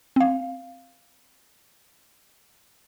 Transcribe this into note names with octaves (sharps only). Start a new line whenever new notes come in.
C4 F5